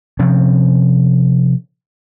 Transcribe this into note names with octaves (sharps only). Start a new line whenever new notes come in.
C3 F3 C4 C#4